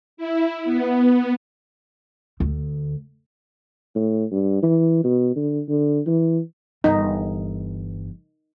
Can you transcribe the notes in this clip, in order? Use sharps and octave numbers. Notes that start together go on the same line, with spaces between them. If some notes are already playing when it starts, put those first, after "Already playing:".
E4
B3
D2
A2
G2
E3
B2
D3
D3
E3
G1 E3 D#4